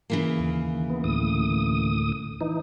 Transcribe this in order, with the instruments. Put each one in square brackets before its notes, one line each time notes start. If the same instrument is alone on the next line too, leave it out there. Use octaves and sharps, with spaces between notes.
[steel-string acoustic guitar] C#3 E3 A#3
[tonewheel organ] D#2
B3
D2 A2 D#6
E3 D#4